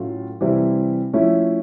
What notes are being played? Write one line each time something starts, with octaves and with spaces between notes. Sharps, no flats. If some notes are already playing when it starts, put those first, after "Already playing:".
Already playing: A2 F#3 A3 C#4 F4
C3 E3 G3 C4 E4
F3 A3 C#4 E4